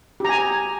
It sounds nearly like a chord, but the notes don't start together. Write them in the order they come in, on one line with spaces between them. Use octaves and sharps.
G4 A#5 G#5